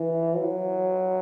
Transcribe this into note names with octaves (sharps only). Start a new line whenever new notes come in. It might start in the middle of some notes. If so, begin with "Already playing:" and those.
Already playing: E3
F#3